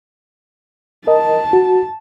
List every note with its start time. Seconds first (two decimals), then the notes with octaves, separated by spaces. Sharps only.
1.07 A#4 D#5 A5
1.53 F#4